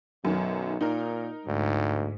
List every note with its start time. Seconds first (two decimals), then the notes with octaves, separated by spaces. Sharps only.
0.25 B1 F#2 D#3
0.81 A#2 D#4 A#4
1.47 D2 G#2